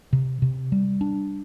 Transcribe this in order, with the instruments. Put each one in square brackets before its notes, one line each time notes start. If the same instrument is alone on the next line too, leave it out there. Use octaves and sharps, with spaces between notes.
[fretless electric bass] C3
C3
G3
D4